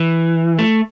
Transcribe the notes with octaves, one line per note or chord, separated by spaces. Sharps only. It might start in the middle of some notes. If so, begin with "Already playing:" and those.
Already playing: E3
A3